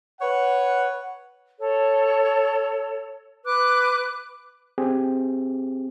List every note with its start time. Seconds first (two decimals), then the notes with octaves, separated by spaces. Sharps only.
0.22 B4 C#5 F#5
1.60 A4 C#5
3.45 B4 D6 F#6
4.78 C4 G4 G#4